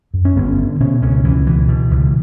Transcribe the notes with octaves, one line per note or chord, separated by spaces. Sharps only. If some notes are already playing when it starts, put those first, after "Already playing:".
F#2
C#4
G1 B3
D3
B2 C#4
C#2 C#4
C#2 E3
B2 E3
B2
C#2